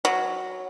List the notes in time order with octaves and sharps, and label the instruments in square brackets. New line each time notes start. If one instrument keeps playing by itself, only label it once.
[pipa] F#3